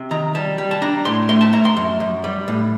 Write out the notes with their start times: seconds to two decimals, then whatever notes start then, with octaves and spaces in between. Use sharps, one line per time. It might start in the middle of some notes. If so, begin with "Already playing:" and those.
Already playing: C3
0.11 D#3 A#5
0.35 G3 A5
0.58 G3
0.71 A5
0.82 D4 A#5
1.05 A2 C6
1.29 A3 C6
1.41 A5
1.53 A3 A#5
1.65 C6
1.77 F#2
2.00 F#2
2.24 G3
2.48 A2